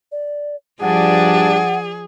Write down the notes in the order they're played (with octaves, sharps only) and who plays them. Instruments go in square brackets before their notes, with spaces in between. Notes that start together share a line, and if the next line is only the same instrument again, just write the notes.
[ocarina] D5
[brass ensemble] G2 D4 [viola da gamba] F3 D5 [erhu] G#4 [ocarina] F#5